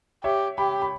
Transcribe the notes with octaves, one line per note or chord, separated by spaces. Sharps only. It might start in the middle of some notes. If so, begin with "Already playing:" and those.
G4 C#5 E5
G4 G5 B5
B5